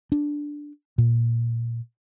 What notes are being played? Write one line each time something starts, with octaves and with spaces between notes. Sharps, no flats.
D4
A#2